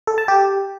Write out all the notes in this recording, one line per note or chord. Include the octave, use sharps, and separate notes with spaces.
A4
A5
G4